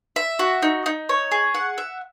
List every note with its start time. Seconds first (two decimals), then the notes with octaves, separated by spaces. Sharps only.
0.16 E5
0.39 F#4
0.62 D#4
0.86 D#4
1.09 C#5
1.31 G#4
1.55 F#5
1.78 E5